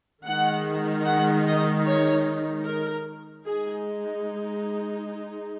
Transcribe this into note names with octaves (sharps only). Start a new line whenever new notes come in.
D#3 G#3 D#4 F#5
F#5
D#5
C#5
A#4
G#3 D#4 G#4